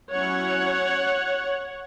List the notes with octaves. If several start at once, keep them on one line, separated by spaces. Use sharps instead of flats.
F#3 C#4 E4 C#5 F#5